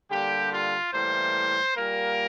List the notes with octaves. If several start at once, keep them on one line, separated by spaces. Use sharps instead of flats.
D3 G3 A#3 G4
F4
A2 E3 G3 A#3 C5
A#2 G3 A#3 A#4